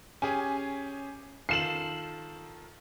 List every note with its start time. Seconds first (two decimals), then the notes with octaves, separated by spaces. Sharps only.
0.22 C#4 G4 G#4 G#5
1.49 D#3 F4 A4 C7 E7 F#7